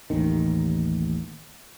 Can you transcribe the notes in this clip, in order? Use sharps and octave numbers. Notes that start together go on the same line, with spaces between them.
A1 D#2 D#3